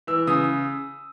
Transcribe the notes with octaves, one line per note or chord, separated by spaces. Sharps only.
E3 E6
C#3 D#6